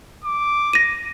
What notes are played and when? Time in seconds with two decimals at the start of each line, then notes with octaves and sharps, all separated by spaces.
0.24 D6
0.73 A#6 D#7